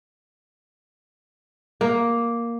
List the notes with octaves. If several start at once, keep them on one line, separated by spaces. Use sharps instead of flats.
A#3